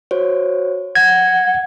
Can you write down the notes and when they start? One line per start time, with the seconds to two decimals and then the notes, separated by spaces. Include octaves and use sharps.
0.11 F#4 C5 C#5
0.95 F#5 G#6 A#6